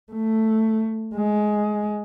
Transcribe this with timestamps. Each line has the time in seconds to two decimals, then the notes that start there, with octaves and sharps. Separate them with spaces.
0.13 A3
1.15 G#3